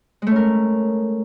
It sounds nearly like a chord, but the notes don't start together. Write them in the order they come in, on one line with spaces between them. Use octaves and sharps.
G#3 A3 C#4 A#4